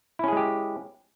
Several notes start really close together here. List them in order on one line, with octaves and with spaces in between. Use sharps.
E4 C#4 G#4 G#3 G4